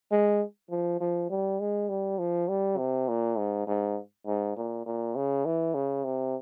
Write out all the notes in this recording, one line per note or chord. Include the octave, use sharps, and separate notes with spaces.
G#3
F3
F3
G3
G#3
G3
F3
G3
C3
A#2
G#2
G#2
G#2
A#2
A#2
C#3
E3
C#3
C3